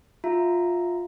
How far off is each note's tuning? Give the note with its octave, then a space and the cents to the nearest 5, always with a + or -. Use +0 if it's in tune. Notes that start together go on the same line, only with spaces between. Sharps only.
F4 +15 E5 +0 A#5 +0